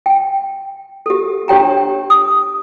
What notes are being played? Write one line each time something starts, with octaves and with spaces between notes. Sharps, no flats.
G5
G4 A4
D4 G4 C#5 G5 A#5
D#6